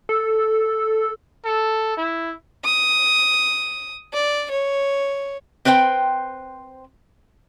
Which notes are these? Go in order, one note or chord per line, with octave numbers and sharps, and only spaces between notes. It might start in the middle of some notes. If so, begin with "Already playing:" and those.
A4
A4
E4
D#6
D5
C#5
C4 B4 C5 E5 G5